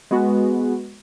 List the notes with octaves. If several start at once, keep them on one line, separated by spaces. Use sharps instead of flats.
G#3 B3 F#4